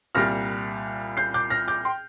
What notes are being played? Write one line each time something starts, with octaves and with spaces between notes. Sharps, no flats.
C2 A#2 G3 F6 A#6
G6 C7
D6 G6
F6 A#6
D6 G6
G5 C6